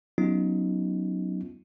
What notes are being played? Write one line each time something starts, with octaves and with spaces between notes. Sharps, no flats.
F#3 B3 C#4 D#4 F4